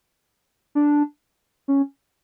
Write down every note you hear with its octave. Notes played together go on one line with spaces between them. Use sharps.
D4
C#4